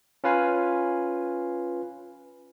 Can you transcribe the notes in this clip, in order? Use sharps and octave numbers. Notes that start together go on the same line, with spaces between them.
C#4 F4 B4 F5 G#5